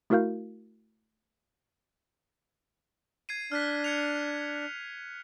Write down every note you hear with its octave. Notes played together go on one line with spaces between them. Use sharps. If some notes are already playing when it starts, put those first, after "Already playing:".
A3 E4 F#4 A#4 F5 G6
G#6 C7 D#7
D4 F6 F#6 B6
G#6 C#7 F7